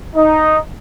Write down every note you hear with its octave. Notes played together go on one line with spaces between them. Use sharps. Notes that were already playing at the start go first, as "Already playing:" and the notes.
D#4 D#5